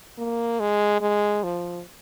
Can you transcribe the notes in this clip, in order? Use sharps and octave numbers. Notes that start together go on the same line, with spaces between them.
A#3
G#3
G#3
F3